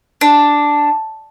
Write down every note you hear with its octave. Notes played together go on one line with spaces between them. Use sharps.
D4